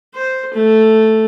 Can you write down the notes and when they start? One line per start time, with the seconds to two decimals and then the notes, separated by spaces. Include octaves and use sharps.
0.15 C5
0.53 A3